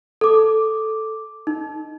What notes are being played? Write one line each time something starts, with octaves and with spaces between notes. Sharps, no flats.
A4 D6
D#4